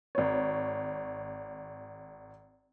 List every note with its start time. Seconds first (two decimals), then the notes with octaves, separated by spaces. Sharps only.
0.15 G#1 C#5